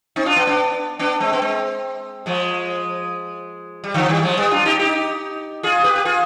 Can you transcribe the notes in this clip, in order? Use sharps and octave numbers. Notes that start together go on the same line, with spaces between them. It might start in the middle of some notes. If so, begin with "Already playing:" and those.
C4 D#4
D4 F4
B3 D4
B3 D4
B3 D4
G#3 C4
B3
G#3 C4
F3 G#3
G3
D3 F3
D#3 G3
F3 G#3
G3 B3
D4 F4
D#4 G4
D#4 G4
F4 G#4
G4 B4
G4
F4 G#4